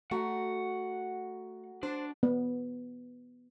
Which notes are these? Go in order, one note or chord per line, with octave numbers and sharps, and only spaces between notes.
A3 F#4 F#5 A#5
D4 C5
B3